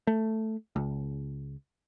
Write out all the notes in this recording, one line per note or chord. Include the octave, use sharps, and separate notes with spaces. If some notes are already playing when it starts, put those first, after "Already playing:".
A3
C#2